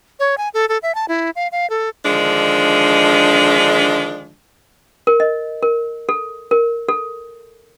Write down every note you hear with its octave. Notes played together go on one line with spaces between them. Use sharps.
C#5
G#5
A4
A4
E5
A5
E4
F5
F5
A4
D3 D#3 F3 G#3 D4
A#4
D#5
A#4
A4
A#4
A4